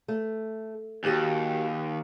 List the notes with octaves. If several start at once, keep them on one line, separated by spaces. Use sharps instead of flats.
A3
D#2 F#4 G4 G#5